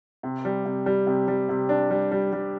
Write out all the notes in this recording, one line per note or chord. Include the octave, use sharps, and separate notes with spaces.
C3
G3
C3
G3
C3
G3
C3
D4
G3
G3
G3